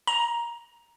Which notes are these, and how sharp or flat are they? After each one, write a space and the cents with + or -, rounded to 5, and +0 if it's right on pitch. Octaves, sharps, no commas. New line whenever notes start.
A#5 +15